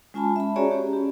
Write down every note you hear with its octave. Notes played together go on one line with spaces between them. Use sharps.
G#3 C#4 F4 G#5 A5 B5
E5 B5
C#4 F#4 G#4 C#5 D5 A#5
C#4 G4
G4